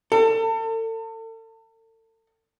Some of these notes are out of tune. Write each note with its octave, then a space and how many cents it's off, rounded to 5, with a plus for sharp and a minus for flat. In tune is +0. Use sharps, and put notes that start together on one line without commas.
A4 +40